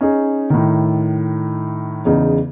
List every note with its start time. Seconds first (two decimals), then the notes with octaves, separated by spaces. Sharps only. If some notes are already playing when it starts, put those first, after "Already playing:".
0.01 C#4 D#4 G#4
0.50 A2 D#3
2.05 E2 C#3 D#4